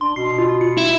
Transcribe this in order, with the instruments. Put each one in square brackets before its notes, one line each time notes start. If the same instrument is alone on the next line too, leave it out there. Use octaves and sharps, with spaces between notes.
[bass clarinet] D4 [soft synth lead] C6
[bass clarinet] B2 [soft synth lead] C7
[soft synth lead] F4
C#7
[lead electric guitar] E4